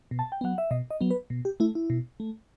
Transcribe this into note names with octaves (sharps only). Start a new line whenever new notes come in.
B2
A5
G5
F#3 B3 F#5
E5
B2 D#5
D#5
F#3 B3
B4
B2
G4
A3 E4
E4
B2
A3